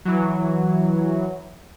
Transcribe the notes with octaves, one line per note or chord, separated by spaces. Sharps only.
E3 F#3